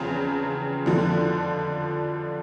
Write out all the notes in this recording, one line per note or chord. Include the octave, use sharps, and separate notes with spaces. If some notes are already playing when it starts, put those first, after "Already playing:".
Already playing: E2 C#3 F3 C4
F2 D3 F3